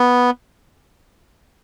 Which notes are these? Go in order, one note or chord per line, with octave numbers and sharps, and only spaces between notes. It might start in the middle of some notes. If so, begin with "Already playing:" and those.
Already playing: B3